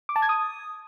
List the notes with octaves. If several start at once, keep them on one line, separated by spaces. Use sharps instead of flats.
D6
A5
G#6
D#6